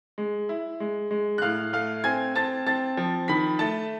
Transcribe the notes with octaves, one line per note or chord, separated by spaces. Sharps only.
G#3
E4
G#3
G#3
F#6
A2 F5 F6
A3 F5 F6
C4 G#5 G#6
C4 A5 A6
C4 A5 A6
F3
D#3 B5 B6
A3 A5 A6